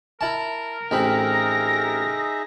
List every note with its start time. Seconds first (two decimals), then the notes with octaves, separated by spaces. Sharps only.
0.21 E4 A#4 A5
0.91 A1 C4 D#4 G#4 E5 B5 A#6